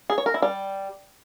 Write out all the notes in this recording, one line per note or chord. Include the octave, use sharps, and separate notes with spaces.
G#4
C#5
A#4
E4
G3